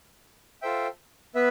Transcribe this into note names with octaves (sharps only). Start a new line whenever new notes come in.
F4 A4 C5 E5 G5
B3 B4 E5